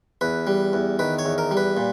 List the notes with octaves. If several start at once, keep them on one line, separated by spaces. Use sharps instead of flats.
E2 B4
G3
E2
D#3 B4
C#5
E2
A#4
G3
B4
A#2